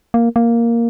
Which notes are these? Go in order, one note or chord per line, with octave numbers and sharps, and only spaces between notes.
A#3
A#3